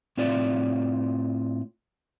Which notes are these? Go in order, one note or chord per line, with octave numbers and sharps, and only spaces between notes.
A2 C4 F4 C#5 D5